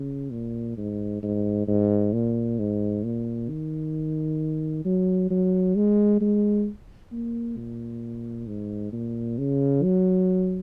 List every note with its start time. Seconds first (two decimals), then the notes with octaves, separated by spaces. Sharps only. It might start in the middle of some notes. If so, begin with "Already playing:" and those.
Already playing: C#3
0.31 A#2
0.77 G#2
1.23 G#2
1.68 G#2
2.13 A#2
2.59 G#2
3.04 A#2
3.49 D#3
4.85 F#3
5.30 F#3
5.75 G#3
6.21 G#3
7.12 A#3
7.57 A#2
8.47 G#2
8.92 A#2
9.38 C#3
9.83 F#3